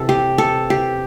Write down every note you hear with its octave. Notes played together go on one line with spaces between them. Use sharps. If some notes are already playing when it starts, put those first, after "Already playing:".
Already playing: C3 E3 A4
G4
A4
G4